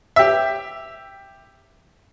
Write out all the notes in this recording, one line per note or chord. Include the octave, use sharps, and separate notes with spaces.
G4 E5